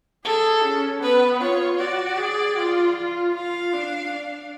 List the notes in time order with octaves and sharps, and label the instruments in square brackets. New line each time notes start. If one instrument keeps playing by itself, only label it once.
[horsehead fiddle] G#4 [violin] A4
[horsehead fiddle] C#4
[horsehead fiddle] B3 [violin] B4
[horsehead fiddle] F4 [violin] C#5
[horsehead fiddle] F#4 [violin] D5
[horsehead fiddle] G#4
F4
F4
[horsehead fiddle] F4 [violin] F5
[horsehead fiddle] D4
D4